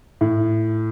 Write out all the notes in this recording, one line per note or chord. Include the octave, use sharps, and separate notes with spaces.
A2